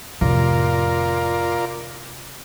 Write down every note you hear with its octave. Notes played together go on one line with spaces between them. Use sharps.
F2 A2 C3 F4 A#4 D5